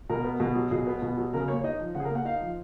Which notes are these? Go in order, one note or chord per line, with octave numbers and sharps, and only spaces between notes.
B2 A#4
B3
B2
F#3
B2 G#4
B3
B2
F#3
C#3 A#4
A#3 C#5
C#5
D#4 D#5
F3
C#3 F#5
G#4
A#4
A#3 F#5
D#4 F5
F3